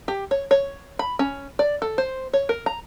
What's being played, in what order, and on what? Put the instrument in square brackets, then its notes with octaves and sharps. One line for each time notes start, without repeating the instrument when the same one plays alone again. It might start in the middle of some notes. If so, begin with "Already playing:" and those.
[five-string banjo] G4
C#5
C#5
B5
C#4
D5
A4
C5
C#5
A#4
A#5